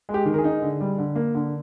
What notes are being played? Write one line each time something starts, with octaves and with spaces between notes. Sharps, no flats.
G#3
G4
D#3
A#4
G#4
D#4
D3
G3
D3
A#3
D3